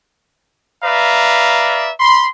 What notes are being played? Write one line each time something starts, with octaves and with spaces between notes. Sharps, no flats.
B4 D5 E5 F5 A#5
B5 C6